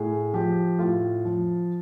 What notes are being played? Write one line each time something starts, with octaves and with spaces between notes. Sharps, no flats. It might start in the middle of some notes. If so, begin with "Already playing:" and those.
Already playing: A2 G#4
F3 G4
A2 F4
F3